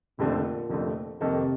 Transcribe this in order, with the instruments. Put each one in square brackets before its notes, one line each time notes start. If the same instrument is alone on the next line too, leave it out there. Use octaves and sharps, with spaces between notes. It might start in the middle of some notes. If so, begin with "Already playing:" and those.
[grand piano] F1 F2 D3 A3 C4 [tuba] A#2
[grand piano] F1 F2 D3 A3 C4
[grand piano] F2 D#3 A#3 D#4 A4 [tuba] C3